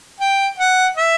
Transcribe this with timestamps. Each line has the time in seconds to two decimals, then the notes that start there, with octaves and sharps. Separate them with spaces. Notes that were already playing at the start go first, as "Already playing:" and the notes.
0.20 G5
0.59 F#5
0.97 E5